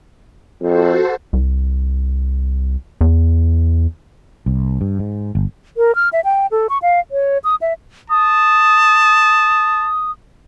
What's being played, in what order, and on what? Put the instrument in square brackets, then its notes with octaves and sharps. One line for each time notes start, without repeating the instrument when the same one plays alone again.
[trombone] F2 [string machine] F#4 A4 C5
[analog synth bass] C2
E2
[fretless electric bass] C2
G2
G#2
G1
[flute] A#4
F6
E5
G5
A4
C#6
F5
C#5
D#6
E5
[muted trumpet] A5 [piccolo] D#6